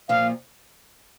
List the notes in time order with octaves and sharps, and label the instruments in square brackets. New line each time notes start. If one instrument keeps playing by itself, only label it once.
[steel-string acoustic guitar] A#2 F3 A#3 F4 [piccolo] F5